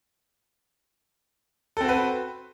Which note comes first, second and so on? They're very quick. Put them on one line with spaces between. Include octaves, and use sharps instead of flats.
A4 C4 F#4 B4